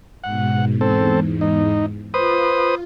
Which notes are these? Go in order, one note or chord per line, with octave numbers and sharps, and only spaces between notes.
G#2 B2 F#5
E2 G#2 C4 A4
D#4
F4 B4 C5 D#6